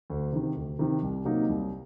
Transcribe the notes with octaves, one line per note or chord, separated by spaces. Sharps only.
D2
C3 D#3
D2
C3 D#3
C2
C3 F#3 A#3 D#4
C2